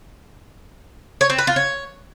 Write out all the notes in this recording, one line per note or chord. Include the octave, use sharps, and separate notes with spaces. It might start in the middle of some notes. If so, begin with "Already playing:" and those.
C#5
C4
B4
F4
C#5